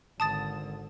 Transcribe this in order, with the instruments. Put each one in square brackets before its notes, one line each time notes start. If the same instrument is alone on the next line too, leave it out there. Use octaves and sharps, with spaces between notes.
[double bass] G#1 D3 [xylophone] A5 D#6 A6